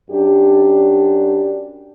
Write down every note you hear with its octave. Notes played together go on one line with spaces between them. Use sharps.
F#2 D4 G4